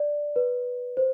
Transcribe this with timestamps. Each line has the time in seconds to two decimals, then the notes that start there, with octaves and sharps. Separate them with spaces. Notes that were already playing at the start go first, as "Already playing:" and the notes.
Already playing: D5
0.36 B4
0.97 C5